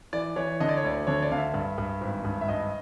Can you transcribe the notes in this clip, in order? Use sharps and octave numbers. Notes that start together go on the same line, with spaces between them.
E3 D5
E3 C#5
D3 D#5
D5
C#5
D2 D5
D3 C#5
D5
D3 F5
E5
G2
G2
G#1
G2
E5
G2 D#5